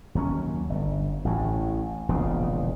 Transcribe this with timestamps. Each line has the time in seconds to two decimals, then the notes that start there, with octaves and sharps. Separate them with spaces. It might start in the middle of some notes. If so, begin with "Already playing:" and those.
0.15 D#2 F#3 C#4
0.69 G1
1.25 A1 A2
2.09 E1 A#1 C#3